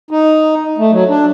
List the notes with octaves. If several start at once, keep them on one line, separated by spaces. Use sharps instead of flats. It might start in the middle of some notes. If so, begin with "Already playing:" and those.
D#4
A3
F#3
D4